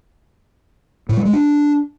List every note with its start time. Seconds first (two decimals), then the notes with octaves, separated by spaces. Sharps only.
1.09 A2
1.17 G3
1.25 G#3
1.33 D4